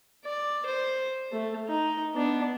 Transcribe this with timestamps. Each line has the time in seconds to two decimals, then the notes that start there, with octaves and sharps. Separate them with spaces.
0.24 D5
0.65 C5
1.32 A3
1.68 D#4
2.15 B3 D4